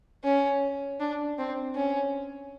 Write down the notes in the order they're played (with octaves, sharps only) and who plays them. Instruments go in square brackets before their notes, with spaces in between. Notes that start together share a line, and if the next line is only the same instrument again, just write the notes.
[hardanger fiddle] C#4
D4
C4
C#4